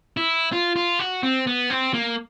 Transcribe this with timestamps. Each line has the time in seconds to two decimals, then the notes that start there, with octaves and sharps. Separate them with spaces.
0.17 E4
0.52 F4
0.76 F4
0.99 F#4
1.23 C4
1.47 B3
1.70 C4
1.94 A#3